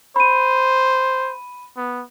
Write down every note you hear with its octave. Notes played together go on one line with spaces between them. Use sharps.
C5 B5 D#7
B3